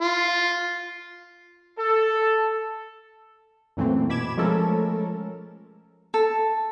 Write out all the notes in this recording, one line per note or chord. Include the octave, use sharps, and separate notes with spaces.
F4
A4
F#2 A#2 E3 A3 C4
B2 B5 D6 G#6 E7
F3 G#3 A3 C#4 A4 A#4
A4